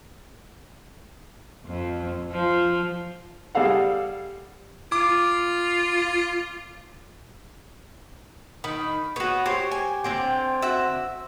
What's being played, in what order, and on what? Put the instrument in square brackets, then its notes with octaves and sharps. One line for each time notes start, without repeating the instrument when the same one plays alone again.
[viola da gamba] F2
F3
[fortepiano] G3 G#4 A4 F5 F#5
[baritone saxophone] F4 [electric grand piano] D6
[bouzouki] D#3 [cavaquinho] B5
[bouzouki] B3 G#4 [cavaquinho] F#4 C#5
[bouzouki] G4 [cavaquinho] C5 C#5
[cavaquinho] G#5
[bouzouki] D3 C4 G5
[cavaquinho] F#4 E5